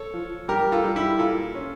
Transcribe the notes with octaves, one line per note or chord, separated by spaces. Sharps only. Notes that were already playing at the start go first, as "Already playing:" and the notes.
Already playing: A4 C#5
F3
G3 G4 A#4
F4 A4
G3
E4 G4
A#2 F4 A4
C#4